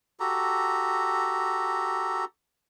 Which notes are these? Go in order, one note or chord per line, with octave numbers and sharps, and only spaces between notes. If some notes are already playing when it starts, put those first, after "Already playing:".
F#4 G4 A4 A#5